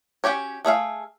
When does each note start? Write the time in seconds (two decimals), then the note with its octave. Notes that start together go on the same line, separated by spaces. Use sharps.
0.24 C#4 F#4 G4 C#5
0.65 A3 G#4 E5 F5